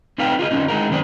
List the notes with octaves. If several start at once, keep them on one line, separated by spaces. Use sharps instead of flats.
C4 D#4 A4 B4 F5 G5
F4 G#4 D#5
F2 D3 F3 B3 C#4 D#4
G#3 D#4 E4 A#4
F#2 C3 D#3 F4 C5 D5